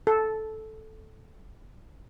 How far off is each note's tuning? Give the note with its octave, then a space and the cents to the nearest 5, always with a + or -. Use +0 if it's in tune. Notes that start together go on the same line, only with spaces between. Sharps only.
A4 -10